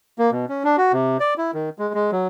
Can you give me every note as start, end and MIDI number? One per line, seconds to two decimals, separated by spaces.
0.19 0.30 58
0.32 0.45 47
0.49 0.63 61
0.64 0.76 62
0.77 0.92 66
0.93 1.17 48
1.20 1.34 74
1.38 1.51 64
1.54 1.69 51
1.79 1.93 56
1.94 2.11 56
2.12 2.28 54